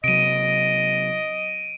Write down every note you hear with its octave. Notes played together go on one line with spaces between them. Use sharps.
C3 F#3 D#5 D7 D#7